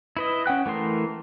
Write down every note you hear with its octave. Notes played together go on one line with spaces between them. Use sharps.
E4 B4 D#5
C#4 F#5 G5 F#6
E3 A3 A#4 C6